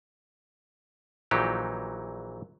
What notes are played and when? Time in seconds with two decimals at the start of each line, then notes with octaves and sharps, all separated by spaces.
1.31 A#1 A#2 E3 F#3 D#4 G4